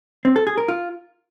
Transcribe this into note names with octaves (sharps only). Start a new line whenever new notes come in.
C4
A4
G#4
A#4
F4